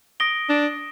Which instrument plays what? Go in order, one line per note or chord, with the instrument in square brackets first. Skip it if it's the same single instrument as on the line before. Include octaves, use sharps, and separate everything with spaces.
[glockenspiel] D#6 A#6 D7 G7
[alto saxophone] D4